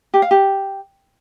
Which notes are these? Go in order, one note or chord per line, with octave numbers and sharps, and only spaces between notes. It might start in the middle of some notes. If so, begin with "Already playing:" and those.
G4
F5
G4